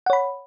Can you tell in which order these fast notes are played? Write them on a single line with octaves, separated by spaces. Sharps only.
F#5 C#5 B5